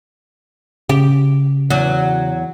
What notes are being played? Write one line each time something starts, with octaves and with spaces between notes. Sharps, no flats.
C#3 G4
E2 F#3